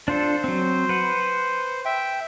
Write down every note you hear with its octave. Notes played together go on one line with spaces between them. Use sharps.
D4 F4 A4 C5
F#3 C4
B4 F#5
E5 G5